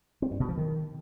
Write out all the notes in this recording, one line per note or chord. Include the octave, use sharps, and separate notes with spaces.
C4
G2
B2
F3
D#3